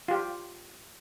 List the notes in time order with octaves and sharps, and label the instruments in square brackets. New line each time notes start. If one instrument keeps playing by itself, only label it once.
[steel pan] F4 G4